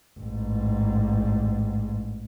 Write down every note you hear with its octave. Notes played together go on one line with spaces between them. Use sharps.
A1 G#2